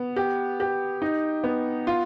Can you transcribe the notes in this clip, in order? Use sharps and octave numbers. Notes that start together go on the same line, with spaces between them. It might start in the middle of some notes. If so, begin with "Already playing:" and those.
Already playing: B3
G4
G4
D#4
B3
F4